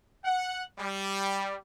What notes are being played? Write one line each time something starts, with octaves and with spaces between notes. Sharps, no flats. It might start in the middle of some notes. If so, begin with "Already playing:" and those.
F#5
G3